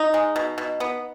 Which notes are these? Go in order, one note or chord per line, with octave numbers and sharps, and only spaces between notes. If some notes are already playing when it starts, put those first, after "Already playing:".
Already playing: D#4
G#3
B2
B2
B3